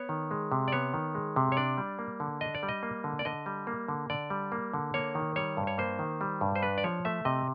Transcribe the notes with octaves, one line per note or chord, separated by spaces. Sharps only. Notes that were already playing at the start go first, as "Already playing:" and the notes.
Already playing: B3 C#5
D#3
G#3
C3
D5
B3 C#5
D#3
G#3
C3
C#5
D4 D5
G3
A#3
D3
D4 D#5
D5
G3
D#5
A#3
D3
D5
D3 D#5
G3
A#3
D3
D3 D5
G3
A#3
D3
A#3 C#5
D#3
G3 C#5
G2
C#5
A#3 C5
D#3
G3
G2
C5
D4 B4
D5
F3 C#5
A3 E5
C3 D#5